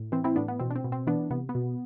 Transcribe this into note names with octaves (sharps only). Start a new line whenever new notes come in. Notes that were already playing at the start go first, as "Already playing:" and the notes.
Already playing: A2
E3 C4
C4 E4
A2 B3 D4
B3
B2 C4
D4
C4
B2
C4
E3 B3 D4
C3 B3
B3
B2